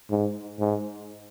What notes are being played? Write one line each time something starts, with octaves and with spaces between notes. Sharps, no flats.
G#2
G#2